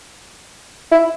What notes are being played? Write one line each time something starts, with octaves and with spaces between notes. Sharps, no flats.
E4